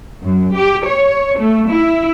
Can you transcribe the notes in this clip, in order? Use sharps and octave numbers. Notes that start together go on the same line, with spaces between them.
F#2
G4
C#5
A3
E4